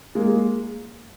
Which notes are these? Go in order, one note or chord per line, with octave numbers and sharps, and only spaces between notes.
G#3 A#3